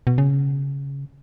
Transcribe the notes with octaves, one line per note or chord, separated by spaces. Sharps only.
B2
C#3